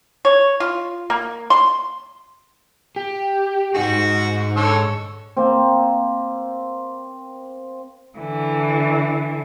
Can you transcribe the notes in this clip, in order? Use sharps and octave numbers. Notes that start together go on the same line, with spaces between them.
C#5
F4
A#3
C6
G4
G#2 D#4 F#4 G#4
D3 A4 C#5
A#3 C4
D3 E3